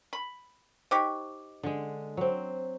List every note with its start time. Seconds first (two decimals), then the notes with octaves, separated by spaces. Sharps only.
0.13 B5
0.91 D#4 G4 C5 C#5 D6
1.63 D3 G#3
2.17 F#3 C4